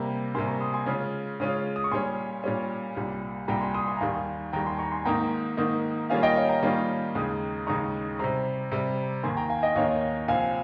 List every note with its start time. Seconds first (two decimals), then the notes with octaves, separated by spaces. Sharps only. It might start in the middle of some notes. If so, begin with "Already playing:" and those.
Already playing: C3 G3 A#3 G5 A#5
0.34 C3 G3 A#3 G#5 C6
0.47 A#5 C#6
0.61 C6 D#6
0.74 G#5 C6
0.86 C#3 G#3 C#4 F4
1.40 C#3 G#3 C#4 F4
1.76 D#6
1.84 C#6
1.91 A#2 G3 C#4 G#5 C6
2.44 A#2 G3 C#4
2.97 C2 A#2 G3
3.48 C2 A#2 G3 G5 A#5
3.61 G#5 C6
3.74 C6 D#6
3.87 G#5 C6
3.97 A#5
4.01 D#2 D#3 G3 F5 G#5
4.53 D#2 D#3 G3 G5 A#5
4.66 G#5 C6
4.79 A#5 C#6
4.92 G#5 C6
5.05 G#2 D#3 A#3 D#4 G5 A#5
5.57 G#2 D#3 A#3 D#4
6.10 D#3 G3 A#3 C#4 F4 F5 G#5
6.23 D#5 G5
6.36 C#5 F5
6.49 G5 A#5
6.62 D#3 G3 A#3 C#4 F4
7.15 D#2 C#3 G#3 D#4
7.67 D#2 C#3 G#3 D#4 A#5 C#6
8.19 C3 G3 C4 A#5 C#6
8.72 C3 G3 C4
9.23 D#2 D#3 A#3 G#5 C6
9.37 G5 A#5
9.50 F5 G#5
9.63 D#5 G5
9.76 D#2 D#3 A#3 C#5 F5
10.28 C2 A#2 F3 C4 F5 G#5